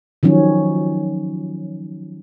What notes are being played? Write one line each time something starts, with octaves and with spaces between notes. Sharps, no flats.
D#3 F3 F#3 C#4